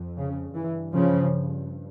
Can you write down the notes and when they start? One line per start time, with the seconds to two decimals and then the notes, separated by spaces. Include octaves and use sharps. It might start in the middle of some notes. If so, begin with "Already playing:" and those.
Already playing: F2
0.18 C#3
0.56 G2 E3
0.94 C#3 F3